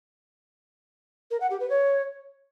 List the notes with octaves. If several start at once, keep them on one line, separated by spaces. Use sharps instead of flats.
A#4
F#5
G4
B4
C#5